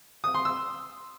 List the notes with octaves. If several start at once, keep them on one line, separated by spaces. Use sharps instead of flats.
D#6
C6
E6